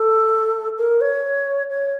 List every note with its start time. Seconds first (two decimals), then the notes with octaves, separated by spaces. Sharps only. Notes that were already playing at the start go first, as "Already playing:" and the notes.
Already playing: A4
0.77 A#4
1.00 C#5
1.70 C#5